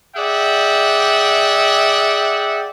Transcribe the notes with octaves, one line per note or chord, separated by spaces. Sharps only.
G#4 D5 E5 F#5 G5